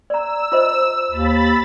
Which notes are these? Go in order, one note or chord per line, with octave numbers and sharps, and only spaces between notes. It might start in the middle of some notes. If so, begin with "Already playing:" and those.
D5 A#5 E6
F4 C5 D#5
D#2 B5 A6